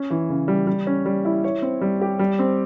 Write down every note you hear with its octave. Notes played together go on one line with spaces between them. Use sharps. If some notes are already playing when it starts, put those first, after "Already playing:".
Already playing: C#4
E3
C#3
G3
G3
C#4
G3
E4
C#5
C4
G3
G4
G3
C4